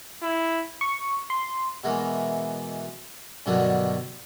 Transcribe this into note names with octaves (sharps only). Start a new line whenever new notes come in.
E4
C#6
C6
B2 E3 G#3 A#3
G2 B2 D3 D#3 F#3 D4